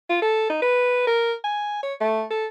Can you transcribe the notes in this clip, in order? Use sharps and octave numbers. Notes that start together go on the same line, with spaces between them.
F4
A4
D#4
B4
A#4
G#5
C#5
A3
A4